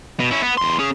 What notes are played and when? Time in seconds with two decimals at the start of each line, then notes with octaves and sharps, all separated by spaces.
0.20 B2
0.31 C#4 E4
0.43 B3
0.58 E2 C6
0.79 C#4 G#4